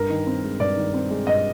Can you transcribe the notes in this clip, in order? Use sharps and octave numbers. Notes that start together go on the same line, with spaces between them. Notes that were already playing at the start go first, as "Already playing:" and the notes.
Already playing: G2 A#4
D#3
C4
G#3
G2 D5
D#3
C4
G#3
G2 D#5